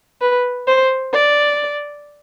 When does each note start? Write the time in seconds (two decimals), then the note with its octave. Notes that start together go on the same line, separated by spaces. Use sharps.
0.21 B4
0.67 C5
1.13 D5